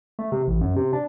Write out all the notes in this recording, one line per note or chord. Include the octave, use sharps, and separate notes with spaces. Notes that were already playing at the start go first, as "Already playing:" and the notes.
A3
C3
A1
F#2
C3
D4